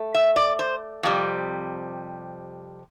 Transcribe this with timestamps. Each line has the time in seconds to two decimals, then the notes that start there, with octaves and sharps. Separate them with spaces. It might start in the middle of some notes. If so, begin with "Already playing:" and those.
Already playing: A3
0.14 E5
0.36 D5
0.59 C5
1.03 F2 C3 G3